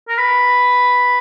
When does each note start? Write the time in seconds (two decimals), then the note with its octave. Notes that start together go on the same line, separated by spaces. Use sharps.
0.09 A#4
0.18 B4